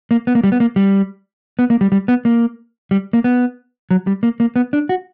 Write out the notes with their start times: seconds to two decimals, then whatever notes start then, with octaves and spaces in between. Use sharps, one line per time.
0.11 A#3
0.27 B3
0.35 A#3
0.44 G3
0.52 B3
0.60 A#3
0.76 G3
1.59 B3
1.70 A#3
1.81 G3
1.92 G3
2.08 B3
2.25 A#3
2.91 G3
3.13 A#3
3.24 B3
3.91 F#3
4.07 G3
4.23 A#3
4.40 A#3
4.56 B3
4.73 D4
4.89 F#4